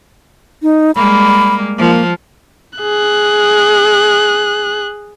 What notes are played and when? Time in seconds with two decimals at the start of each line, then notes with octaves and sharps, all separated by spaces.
0.63 D#4
0.95 G3 G#3 A#3 B5
1.78 F3 A#3
2.79 G#4 F#6